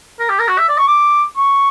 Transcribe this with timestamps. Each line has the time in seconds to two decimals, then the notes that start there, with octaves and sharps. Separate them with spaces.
0.20 A#4
0.29 G4
0.39 A#4
0.48 F#4
0.58 E5
0.69 D5
0.78 C#6
0.88 D6
1.37 C#6